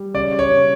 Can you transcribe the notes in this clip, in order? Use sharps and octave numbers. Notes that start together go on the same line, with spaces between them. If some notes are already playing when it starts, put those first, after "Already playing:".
Already playing: G3
C#3 D5
C#5
C#3